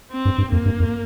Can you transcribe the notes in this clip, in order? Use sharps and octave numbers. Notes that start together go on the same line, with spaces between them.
C4
G2
G2
F2 A#3
G2
F2